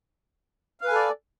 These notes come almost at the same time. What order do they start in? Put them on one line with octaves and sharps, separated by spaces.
F5 B4 G#5 A4 D5